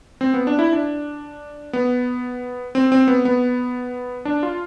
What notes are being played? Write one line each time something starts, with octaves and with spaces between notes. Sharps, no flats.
C4
B3
D4
E4
D4
B3
C4
C4
B3
B3
D4
F4